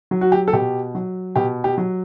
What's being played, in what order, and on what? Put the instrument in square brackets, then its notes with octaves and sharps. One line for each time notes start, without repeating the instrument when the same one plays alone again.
[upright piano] F#3
F#4
G4
A4
B2 G4
F#3
B2 G4
G4
F#3